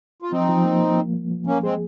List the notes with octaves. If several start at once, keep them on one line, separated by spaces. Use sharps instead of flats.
F4
F3 C4 D#4
F3
A#3
A#3
A#3
A#3
F3
F3 A#3 C#4
G#3 C4 G#4